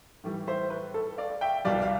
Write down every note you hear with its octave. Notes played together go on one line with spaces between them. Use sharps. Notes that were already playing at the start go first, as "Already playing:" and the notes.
A2 E3 G3
C5 E5
B4
A4
D5 F5
E5 G5
C2 B2 G3 D5 F5
F5